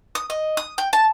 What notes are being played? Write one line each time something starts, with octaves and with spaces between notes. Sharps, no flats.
D#6
D#5
D#6
G5
A5